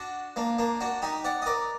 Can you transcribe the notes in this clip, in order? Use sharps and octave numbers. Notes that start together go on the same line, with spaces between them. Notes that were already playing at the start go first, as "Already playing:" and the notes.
Already playing: D4 F#4
A#3 D4
A#3 D4
D4 F#4
D#4 G4
D5 F#5
D#5
A#4 D5